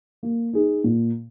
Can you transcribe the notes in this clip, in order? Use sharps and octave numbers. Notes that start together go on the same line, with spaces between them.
A#3
D#4 G#4
A#2